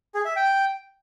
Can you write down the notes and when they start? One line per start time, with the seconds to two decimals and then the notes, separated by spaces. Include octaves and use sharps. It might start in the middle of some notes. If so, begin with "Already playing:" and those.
0.15 G#4
0.25 E5
0.36 G5